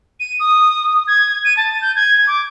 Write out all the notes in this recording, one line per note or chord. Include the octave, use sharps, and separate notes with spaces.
D#7
D#6
G#6
D#7
A5
G6
G#6
D6